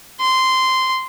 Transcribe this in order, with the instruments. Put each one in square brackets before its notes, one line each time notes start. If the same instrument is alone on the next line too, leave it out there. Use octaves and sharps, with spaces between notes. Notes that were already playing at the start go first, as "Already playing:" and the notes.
[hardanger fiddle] C6